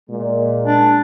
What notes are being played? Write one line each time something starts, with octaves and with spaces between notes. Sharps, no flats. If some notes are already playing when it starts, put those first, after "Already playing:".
A#2 G#3
D4